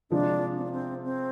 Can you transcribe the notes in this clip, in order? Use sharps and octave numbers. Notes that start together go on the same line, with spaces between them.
C3 F3 G#3 D4
C4
D4
C4
C4